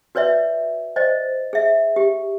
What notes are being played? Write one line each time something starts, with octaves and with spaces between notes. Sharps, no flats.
F#4 B4 C#5 D5 E5
C5 D5 D#5
G#4 E5
G4